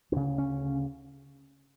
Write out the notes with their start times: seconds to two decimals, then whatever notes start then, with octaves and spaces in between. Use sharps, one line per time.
0.12 D2 C#3 D4
0.38 C#4